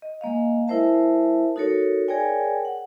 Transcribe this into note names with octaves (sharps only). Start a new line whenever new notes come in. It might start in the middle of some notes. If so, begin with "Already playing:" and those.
D#5
G#3 A#3 D#5 F5
G#3 E4 A#4 C5 E5 A5
D#4 F#4 A4 A#4 C#5
G#4 A#4 C#5 D5 G5 G#5
F#5